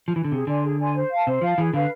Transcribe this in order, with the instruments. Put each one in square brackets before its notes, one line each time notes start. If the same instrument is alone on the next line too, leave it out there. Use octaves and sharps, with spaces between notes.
[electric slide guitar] F3
E3
D3
[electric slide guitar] C3 [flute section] G#4
[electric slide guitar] D3 [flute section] D5 G#5 C6
[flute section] G#4
D5 G#5 C6
C5
F5 A5
[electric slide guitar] C3 [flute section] C5
[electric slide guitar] F3 [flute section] F5 A5
[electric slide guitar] E3 [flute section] G#4
[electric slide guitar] D3 [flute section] B4 F5